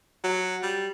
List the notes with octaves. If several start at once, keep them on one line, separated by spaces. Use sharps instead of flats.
F#3
G3